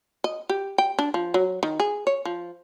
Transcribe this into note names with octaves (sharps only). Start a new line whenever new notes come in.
D#5
G4
G5
D4
F3
F#3
D#3
G#4
C#5
F3